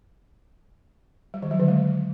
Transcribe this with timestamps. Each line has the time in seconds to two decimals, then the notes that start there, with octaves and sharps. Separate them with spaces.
1.34 G3
1.42 D#3
1.51 F#3
1.60 D3
1.68 G#3